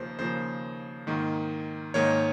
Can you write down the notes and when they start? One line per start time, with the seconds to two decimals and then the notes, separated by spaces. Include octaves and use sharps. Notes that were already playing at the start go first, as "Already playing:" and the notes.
Already playing: D#2 C#3 F3 A#3 C5
0.18 D#2 C#3 F3 A#3 C5
1.07 G#2 D#3 A#3
1.94 G#2 D#3 A#3 C#5